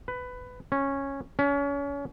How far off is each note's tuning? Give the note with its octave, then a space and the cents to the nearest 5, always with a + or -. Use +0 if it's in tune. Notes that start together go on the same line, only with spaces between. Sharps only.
B4 +15
C#4 -10
C#4 +30